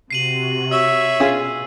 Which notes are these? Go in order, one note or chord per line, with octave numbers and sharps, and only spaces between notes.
C3 F#4 C7 D#7 F#7
C#5 E5 E6
B2 C#4 F4 G#4